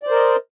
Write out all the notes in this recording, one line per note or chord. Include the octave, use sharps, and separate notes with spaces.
A#4 C5 D5 D#5